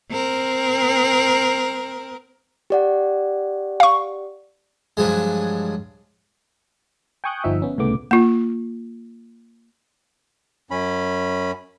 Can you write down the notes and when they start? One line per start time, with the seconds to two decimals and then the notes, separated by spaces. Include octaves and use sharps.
0.11 C4 A#4
2.70 G4 D5 F#5
3.80 F5 C#6
4.97 G2 F3 F#3 G#3
7.24 G5 G#5 C#6 D#6 F#6 G6
7.44 G1 F3 D#4 E5
7.62 B3 C#4
7.78 C2 A2 C#3 A3 B3 D6
8.11 A#3 F4
10.71 F#2 C#4 B5